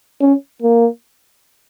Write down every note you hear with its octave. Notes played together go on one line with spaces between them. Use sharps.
C#4
A#3